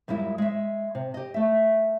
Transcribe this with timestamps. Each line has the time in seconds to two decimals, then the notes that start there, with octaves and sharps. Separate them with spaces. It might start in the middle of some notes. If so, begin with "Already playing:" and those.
0.08 F#2 G3 G#3 E4 F4
0.38 G#3 E5
0.95 C3
1.14 G4 D#5
1.34 A3 E5